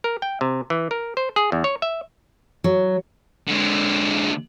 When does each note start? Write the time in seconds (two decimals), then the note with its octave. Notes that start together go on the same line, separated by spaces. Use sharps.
0.04 A#4
0.22 G5
0.41 C3
0.70 E3
0.91 A#4
1.17 C5
1.36 G#4
1.52 E2
1.64 C#5
1.82 E5
2.64 F#3
3.47 D3 G#3